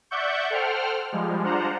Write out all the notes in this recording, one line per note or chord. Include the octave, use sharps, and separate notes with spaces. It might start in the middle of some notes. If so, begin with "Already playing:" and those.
D5 E5 F#5 C#6 G6
A4 C5 F#5 G5 F6
F3 G3 G#3
D4 F4 C5 F#5 A#5